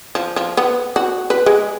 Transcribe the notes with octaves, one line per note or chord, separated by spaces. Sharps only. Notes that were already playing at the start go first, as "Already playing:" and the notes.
F3
F3
B3
F#4
B4
G#3